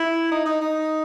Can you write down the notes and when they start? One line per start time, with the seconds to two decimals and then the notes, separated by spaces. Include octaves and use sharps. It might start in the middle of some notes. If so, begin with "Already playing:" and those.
Already playing: E4
0.31 D#4
0.46 D#4
0.61 D#4